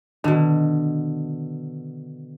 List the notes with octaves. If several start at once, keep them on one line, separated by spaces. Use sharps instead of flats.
B2 D3 D#3